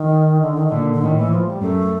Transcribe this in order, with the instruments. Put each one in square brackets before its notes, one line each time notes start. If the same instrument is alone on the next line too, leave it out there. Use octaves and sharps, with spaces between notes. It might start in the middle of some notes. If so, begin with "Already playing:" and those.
Already playing: [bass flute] D#3
D3
D#3
[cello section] A#2 [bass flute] D3
[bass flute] D3
[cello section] A2 [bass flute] D#3
[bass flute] E3
F3
G3
[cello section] F#2 [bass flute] A3